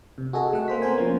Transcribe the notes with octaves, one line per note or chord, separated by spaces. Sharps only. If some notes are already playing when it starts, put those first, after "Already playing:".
C3
F#4 G#4 A4 D#5
A3 F#5
A#3 C5 B6
B3 C4 A#4 C5 G#5
F3 A#3 C#4